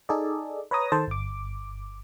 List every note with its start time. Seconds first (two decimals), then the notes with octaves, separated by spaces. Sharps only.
0.09 D#4 G#4 A4 D5
0.71 B4 C#5 A#5 D#6 A#6
0.92 D#3 A4 C5 A5
1.07 G1 D6